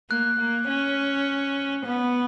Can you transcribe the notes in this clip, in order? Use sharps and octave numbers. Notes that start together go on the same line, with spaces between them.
A#3 F#6
A#3
C#4
B3